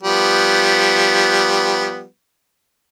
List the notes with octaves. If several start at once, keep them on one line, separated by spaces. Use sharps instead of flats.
F3 G3 B3